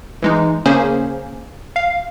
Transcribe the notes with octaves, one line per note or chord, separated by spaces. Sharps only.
E3 G#3 D#4
C#3 A#3 C#4 G#4 C5
F5